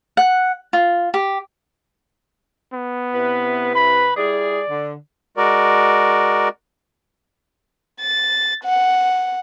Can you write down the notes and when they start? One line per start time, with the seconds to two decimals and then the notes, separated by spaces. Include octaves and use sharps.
0.17 F#5
0.73 F4
1.14 G4
2.73 B3
3.14 C3 E4 B4
3.76 B5
4.17 G3 E4 G#4 D5
4.69 D3
5.37 G#3 F#4 A#4 D5
8.01 A6
8.65 F#5